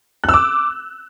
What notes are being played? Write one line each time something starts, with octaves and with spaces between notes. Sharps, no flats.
F#6
E6
D6